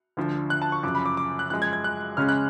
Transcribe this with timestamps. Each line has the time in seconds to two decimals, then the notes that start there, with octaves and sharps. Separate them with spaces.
0.17 D2 D3 F3
0.50 F#6
0.62 A5
0.72 C#6
0.83 F#2 C#3 F3 D6
0.95 B5
1.06 D6
1.17 D6
1.39 F#6
1.50 F#2 F3 G#3 F#6
1.62 G#6
1.73 G#6
1.84 F#6
2.17 C#2 C#3 G#3 C#4 F6
2.29 F#6